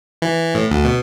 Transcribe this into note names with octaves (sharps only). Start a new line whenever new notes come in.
E3
A2
D2
B2